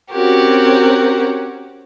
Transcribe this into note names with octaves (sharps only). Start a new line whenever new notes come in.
C4 C#4 F#4 G4 A#4